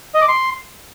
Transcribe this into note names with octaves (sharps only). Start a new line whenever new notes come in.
D#5
D6
C6